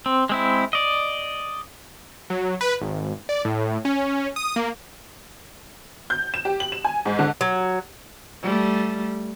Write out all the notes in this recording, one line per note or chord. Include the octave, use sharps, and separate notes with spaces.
C4
G#3 C4 E4
D5 D#5
F#3
B4
G#1
D5
A2
C#4
D#6
A#3
G6
E7
G4
F#7
E7
G#5
G#2
D3
F#3
G3 A3